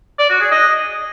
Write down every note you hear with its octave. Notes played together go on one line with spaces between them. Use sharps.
D5
F#4
G#4
D#5